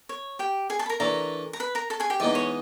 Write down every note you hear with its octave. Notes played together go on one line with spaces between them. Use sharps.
C#5
G4 G5
G#4 G#5
A4 A5
B5
A#4 A#5
E3 A3 D4 A#4 A#5
A#5
B4 B5
A#4 A#5
A4 A5
G#4 G#5
G4 G5
E3 G#3 B3 D#4 D5
C#5